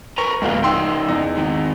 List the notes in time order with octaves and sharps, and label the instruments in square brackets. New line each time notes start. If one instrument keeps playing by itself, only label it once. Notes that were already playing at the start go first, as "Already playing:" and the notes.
[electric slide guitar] A#4 B4 A#5 [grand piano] C#6
[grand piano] D1 F#4 F5 [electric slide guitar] G#3 A#3 B3
[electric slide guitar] C#3 D#4 [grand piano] G5 C6 E6
[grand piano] E2 D#5
[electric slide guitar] G#2 D#3